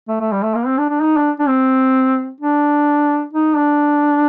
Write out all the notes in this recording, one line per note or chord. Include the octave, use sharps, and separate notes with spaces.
A3
A3
G3
A3
A#3
C4
D4
D4
D#4
D4
D4
C4
D4
D#4
D4